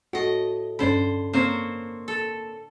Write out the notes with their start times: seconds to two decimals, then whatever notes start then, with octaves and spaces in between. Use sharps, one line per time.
0.13 A2 F#4 D#5
0.79 G2 D3 C#4 C5 B5
1.33 A#3 C4 C5 C#5
2.08 A4